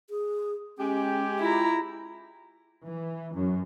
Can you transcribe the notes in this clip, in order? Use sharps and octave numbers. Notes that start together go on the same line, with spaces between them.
G#4
G#3 C#4 G4
E4 F4 A#5
E3
F#2